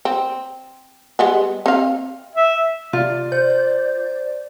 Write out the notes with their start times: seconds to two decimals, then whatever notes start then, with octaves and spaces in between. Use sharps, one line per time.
0.05 C4
1.19 G3 G#3 B3
1.66 C4 F5
2.36 E5
2.93 C3 F4 D5
3.32 C5 G6